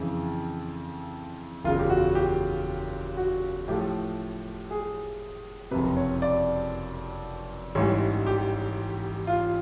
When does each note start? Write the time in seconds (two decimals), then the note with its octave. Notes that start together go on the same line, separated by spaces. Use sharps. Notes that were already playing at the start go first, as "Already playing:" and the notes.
Already playing: F2 C#3 E3
1.64 F#1 E2 C#3 F4
1.79 G4
1.90 F#4
2.15 G4
3.17 F#4
3.68 A2 F3 A3 G4
4.71 G#4
5.71 C3 B4
5.74 F#1 F2
5.97 C#5
6.22 D5
7.75 A1 G#2 E3 G3 C#5
8.27 G4
9.27 F4